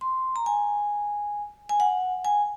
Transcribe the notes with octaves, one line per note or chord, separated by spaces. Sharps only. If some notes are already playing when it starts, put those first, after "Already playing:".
C6
A#5
G#5
G#5
F#5
G#5